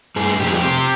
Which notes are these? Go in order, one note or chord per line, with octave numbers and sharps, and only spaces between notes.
G2 G#4
F2 G4
G#4
G4
C3